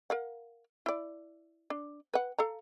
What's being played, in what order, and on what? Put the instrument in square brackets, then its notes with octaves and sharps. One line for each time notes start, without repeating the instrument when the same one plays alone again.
[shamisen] A#4 F5 F#5
E4 D5
D4
B4 F#5
A4 F5 A#5